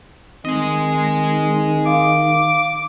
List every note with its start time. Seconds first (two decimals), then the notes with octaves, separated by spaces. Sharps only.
0.45 D#3 C4 G#4 D#5
1.86 F5 D6